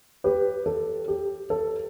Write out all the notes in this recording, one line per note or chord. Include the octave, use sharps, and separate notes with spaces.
G4 B4
A4
G4
A4